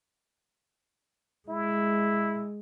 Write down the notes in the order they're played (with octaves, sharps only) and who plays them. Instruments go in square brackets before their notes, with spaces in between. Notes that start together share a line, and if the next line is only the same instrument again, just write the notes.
[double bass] G#3 [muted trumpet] E4